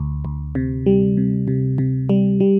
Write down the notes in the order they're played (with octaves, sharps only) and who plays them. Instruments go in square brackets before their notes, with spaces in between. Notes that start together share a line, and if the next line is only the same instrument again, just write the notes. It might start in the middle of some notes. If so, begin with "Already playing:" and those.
Already playing: [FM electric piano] D2
D2
C3
G3
C3
C3
C3
G3
G3